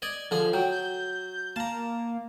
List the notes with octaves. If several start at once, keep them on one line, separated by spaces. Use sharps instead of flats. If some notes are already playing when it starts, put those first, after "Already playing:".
D5 D#5 G#6
D3 F3 G#4
F#3 G5
G6
A#3 A5 A#5